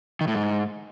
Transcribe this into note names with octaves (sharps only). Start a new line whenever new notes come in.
D#3
A2
G#2